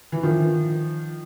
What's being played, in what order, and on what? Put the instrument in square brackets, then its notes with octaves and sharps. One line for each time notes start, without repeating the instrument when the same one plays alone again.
[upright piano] E3
D#3 F3